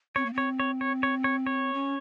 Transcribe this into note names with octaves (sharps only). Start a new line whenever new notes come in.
C4 C#5
A#3
C4 C#5
C#5
C#5
C#5
C#5
C#5
C#4